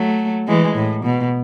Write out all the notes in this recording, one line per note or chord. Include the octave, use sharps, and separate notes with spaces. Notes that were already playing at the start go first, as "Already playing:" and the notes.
Already playing: F#3 A3
E3 G#3
A2
B2